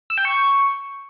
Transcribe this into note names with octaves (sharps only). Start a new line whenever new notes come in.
E6
G5
C#6